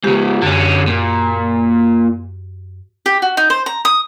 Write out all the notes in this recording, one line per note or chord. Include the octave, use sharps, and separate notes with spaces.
G#2 C#3 G4
F#2 D3 C#4
A#2
G4
F#4
D#4
C5
A#5
D#6